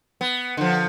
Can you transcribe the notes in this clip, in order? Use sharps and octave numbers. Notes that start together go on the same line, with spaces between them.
B3
D3 F3